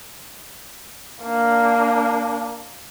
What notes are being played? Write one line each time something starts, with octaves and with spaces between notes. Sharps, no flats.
A#3 D4